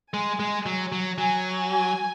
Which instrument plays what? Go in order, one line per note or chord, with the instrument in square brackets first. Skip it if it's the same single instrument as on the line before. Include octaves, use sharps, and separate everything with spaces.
[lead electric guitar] G#3 [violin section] G#5
[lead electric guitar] G#3
F#3
F#3
[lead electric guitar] F#3 [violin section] G#5
[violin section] G#5